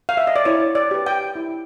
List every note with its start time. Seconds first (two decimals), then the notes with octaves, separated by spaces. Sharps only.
0.09 F5
0.17 E5
0.27 D#5
0.36 D5
0.45 E4 C#5
0.75 D5
0.91 G4 B4
1.06 G5
1.35 E4